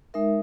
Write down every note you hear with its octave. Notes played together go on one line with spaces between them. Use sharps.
G#3 D#4 A#4 E5